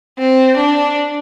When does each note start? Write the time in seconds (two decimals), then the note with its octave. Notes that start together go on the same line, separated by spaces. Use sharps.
0.18 C4
0.57 D4